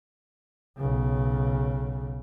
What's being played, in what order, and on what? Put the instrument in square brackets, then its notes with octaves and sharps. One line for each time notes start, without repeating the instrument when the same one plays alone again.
[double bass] B1 C#3